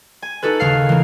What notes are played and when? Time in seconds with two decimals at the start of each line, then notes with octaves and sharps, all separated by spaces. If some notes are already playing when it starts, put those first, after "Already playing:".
0.22 G#5
0.43 D#4 F#4 A4 B4
0.60 D#2 C#3 F5 C7
0.89 E3 A#3